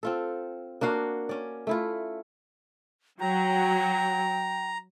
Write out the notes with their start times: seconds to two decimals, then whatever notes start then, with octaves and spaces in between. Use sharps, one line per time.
0.03 C4 F4 A4
0.81 A#3 D4 F#4 F5
1.29 C#4 D5
1.67 A3 E4 F4
3.21 F#3 G5 A#5